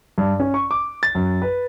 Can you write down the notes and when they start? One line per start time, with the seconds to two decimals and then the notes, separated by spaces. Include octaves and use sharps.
0.18 G2
0.40 C#4
0.54 C#6
0.71 D6
1.03 A6
1.15 F#2
1.42 B4